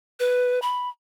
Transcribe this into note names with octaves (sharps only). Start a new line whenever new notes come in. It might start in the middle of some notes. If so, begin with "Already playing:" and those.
B4
B5